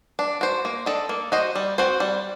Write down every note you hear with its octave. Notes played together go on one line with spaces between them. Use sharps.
D4
F#4 C5
A#3
D4 A4 D#5
A#3
F#4 C5 D#5
G3
C4 F#4 C5
G3